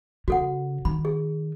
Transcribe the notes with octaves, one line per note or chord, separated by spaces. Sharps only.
C#3 F#4 A4 F#5
D#3 B5
G#4